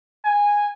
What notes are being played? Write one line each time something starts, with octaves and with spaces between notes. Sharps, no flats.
G#5